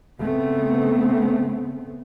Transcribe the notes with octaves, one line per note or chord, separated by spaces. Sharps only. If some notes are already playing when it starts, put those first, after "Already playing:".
C#3 A3 B3 C4